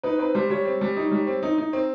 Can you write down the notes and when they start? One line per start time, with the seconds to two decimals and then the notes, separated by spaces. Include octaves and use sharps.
0.03 D#4 B4
0.19 C4 B4
0.35 G3 C5
0.50 G3 C#5
0.65 C4
0.81 G3
0.96 D#4
1.12 G3
1.27 C4
1.43 D#4
1.58 D#4
1.73 C4